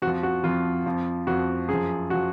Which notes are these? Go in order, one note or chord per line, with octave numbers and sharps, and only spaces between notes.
F2 F#4
F3
F#4
F2 F3 F4
F2 F3
F2 F3 F#4
F#2 F3 G#4
F3 F#4